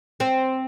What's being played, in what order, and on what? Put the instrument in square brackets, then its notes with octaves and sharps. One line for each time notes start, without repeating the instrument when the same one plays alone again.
[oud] C4